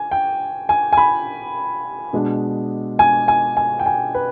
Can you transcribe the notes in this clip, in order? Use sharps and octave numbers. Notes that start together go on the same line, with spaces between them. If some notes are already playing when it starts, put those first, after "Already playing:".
Already playing: G#5
G5
G#5
G#5
B5
B2 G#3 D4
G#5
G#5
G#5
G5
G#5
B4